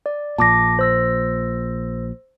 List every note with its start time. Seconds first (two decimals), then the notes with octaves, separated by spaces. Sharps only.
0.06 D5
0.38 A#1 A#2 A5 D6 A#6
0.79 C5 E6 A#6